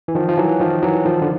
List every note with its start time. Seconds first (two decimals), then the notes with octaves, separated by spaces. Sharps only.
0.08 E3
0.15 D#3 F3
0.29 F3
0.38 E3 F#3
0.60 D#3 F3
0.83 E3 F#3
1.05 D#3 F3
1.22 D3